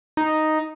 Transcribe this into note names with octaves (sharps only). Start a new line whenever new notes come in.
D#4